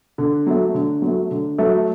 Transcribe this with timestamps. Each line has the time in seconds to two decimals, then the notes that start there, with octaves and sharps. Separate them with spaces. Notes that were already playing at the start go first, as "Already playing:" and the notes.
0.18 D3
0.46 F#3 A3
0.74 D3
1.02 F#3
1.07 A3
1.31 D3
1.58 F#3 A3